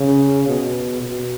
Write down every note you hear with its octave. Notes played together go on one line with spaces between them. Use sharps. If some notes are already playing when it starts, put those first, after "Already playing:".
Already playing: C#3
B2
B2